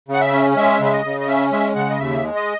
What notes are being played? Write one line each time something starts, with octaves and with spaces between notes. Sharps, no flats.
C#3
F#5
E5
C#4
G#3 E5
C#3
E5
D#5
C#3
D#5
C#4 E5
G#3 E5
C#3 F#5
D#5
D#2 E5
G#3
D#5